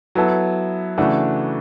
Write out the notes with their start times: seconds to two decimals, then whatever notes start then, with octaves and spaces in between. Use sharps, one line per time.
0.15 F#3 B3 E4 A4
0.98 C#3 E3 A3 D4 F#4